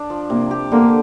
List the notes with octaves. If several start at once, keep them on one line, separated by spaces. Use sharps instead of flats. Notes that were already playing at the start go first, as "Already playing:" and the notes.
Already playing: D4
F3
C3 A#3
G4
D3 A#3